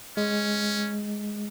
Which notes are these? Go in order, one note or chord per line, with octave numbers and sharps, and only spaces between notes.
G#3 C#4